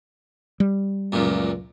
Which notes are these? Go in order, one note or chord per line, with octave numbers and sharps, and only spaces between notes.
G3
C#2 F#2 A#2